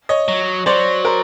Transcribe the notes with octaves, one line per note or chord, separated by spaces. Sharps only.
C#5 D#5
F#3
F#3 C5 D5
A#4 C5